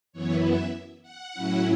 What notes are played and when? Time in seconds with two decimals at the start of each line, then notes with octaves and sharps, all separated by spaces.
0.13 F#2 E3 B3 E4 C#5
0.42 E5
1.02 F#5
1.33 A2 F#3 C#4 E4